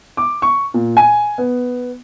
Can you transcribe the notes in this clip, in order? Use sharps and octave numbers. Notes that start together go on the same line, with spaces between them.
D6
C#6
A#2
G#5
B3